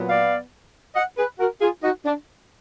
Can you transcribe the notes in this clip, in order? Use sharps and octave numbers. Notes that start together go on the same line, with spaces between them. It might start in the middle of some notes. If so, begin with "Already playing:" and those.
Already playing: A#2 F#3 B3
D5 F5
D#5 F#5
G#4 B4
F#4 A#4
F4 G#4
D#4 F#4
D4